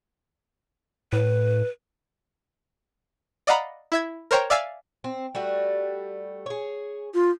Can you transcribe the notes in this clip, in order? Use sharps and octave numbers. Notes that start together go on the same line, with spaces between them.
A2 B4
D5 D#5 F5 F#5 A#5 B5
E4 E5 G#6
A#4 C5 C#5 G5 A#5
D5 E5 F5 G#5 E6 A6
C4
G3 A3 F#4
G#4 C#5
F4